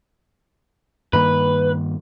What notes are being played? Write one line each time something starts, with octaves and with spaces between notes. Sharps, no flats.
G2 D#3 A#3 B4